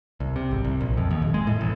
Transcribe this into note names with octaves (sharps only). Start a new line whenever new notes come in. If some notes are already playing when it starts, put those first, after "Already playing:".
C2
C3
G#1
C2
A#1
F2
D#2
D#1
G#3
A2
A1